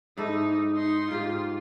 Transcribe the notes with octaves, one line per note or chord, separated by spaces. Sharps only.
G#2 D#4 E4 A4
D#4 C6
G#2 F4 G4